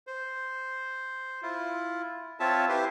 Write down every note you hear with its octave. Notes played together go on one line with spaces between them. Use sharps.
C5
E4 F4
C4 F4 C#5 E5 A5
E4 G4 B4 C5